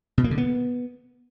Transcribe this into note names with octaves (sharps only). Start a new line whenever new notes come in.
B2
A#3
D3
B3